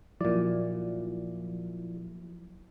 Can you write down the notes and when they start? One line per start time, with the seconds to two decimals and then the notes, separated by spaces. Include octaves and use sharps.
0.21 A#2 F3 F#3 E4 D5